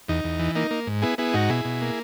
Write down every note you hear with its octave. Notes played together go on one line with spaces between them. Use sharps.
E2 D#4
E2
E3
A#3 D#4
A#3
G#2
B3 E4 G#4
B3 E4 G#4
G#2 D#4 F#4
B2 E4 G#4
B2
A#3